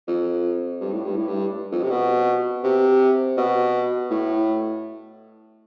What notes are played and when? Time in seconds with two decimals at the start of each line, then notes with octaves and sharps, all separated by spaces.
0.08 F2
0.81 G2
0.93 A2
1.05 G2
1.16 A2
1.28 G2
1.72 F2
1.83 C3
1.90 B2
2.64 C3
3.37 B2
4.10 A2